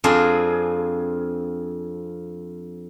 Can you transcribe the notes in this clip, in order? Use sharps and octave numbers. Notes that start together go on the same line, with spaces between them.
F2 C4 D4 F4 G#4